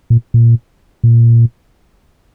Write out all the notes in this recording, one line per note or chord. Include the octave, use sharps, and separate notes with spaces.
A#2
A#2
A#2